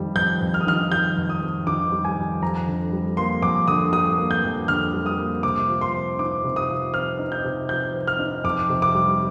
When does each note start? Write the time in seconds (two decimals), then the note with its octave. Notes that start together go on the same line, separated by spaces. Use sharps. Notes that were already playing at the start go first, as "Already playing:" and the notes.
Already playing: F2 D#3 G3
0.16 F2 G6
0.41 F2
0.54 F6
0.61 D#6
0.67 D#3 F6
0.92 G3 G6
1.17 F2
1.29 D#6
1.41 F2
1.67 D#3 D6
1.92 G3
2.05 G#5
2.17 F2
2.42 F2 A#5
2.67 D3
2.92 G3
3.17 A#3 C6
3.42 F2 D6
3.67 D3 D#6
3.93 G3 D#6
4.18 A#3
4.31 G6
4.43 F2
4.68 D3 F6
4.93 G3
5.06 D#6
5.18 A#3
5.43 C3 D6
5.69 F3
5.81 C6
5.93 C4
6.19 D#4 D6
6.44 C3
6.56 D#6
6.69 F3
6.94 C4 F6
7.19 D#4
7.32 G6
7.44 C3
7.69 F3 G6
7.94 C4
8.07 F6
8.19 D#4
8.44 F2 D6
8.69 C3
8.82 D6
8.95 G3